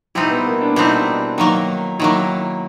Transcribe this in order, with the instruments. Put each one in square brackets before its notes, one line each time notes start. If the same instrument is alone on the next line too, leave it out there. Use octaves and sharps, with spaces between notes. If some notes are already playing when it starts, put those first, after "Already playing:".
[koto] B2 G3 C4 D#4 [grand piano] E4
[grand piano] B3
A#3
D4
[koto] B2 G3 C4 D#4 [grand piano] E4
[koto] D#3 F#3 A#3
[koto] D#3 F#3 A#3 [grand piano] E4